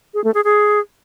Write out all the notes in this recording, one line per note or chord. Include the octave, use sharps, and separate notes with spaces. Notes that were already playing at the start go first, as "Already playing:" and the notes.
G#4
A3
G#4
G#4